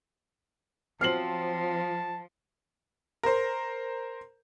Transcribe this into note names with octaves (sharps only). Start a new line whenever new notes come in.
F3 F#3 C4 A5 F6 C7 F#7
A#4 C5